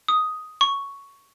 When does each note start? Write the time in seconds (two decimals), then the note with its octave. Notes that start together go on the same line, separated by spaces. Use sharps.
0.08 D#6
0.61 C#6